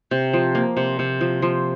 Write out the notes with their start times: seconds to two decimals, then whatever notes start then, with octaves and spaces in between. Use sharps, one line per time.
0.11 C3
0.33 F3
0.55 A#3
0.77 C3
0.99 C3
1.21 F3
1.42 F3